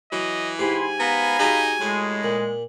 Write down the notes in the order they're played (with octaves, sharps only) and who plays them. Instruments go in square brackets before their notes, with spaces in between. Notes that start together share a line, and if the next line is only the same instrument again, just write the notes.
[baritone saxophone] E3 [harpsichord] F#3 [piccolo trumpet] D#5
[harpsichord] G#2 G4 [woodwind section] E4 C6 [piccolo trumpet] G#5
[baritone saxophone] B3 [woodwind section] F5 A#5 B5
[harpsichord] F#3 G4 G#4 [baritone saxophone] D#4
[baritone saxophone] A2 [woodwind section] G#3
[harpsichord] A#2